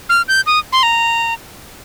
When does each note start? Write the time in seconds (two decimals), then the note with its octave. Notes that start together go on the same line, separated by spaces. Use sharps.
0.09 F6
0.28 G6
0.46 D#6
0.72 C6
0.83 A#5